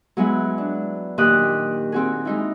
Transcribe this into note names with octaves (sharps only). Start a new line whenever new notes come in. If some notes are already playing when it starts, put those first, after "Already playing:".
F#3 G#3 B3 E4
D4
A#2 D#3 G4 D6 D#6 F#6
C4 F#4 G#4
G#3 D#4 E4